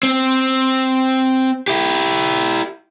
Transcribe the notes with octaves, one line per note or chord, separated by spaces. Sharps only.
C4
E4 G4